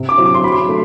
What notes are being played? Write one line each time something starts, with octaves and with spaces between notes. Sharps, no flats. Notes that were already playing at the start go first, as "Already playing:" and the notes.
Already playing: C3
D6
F#3 C4 E4
D6
C6
F#3 B5
C6
A3